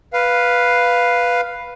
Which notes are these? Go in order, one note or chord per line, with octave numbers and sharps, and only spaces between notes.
B4 F5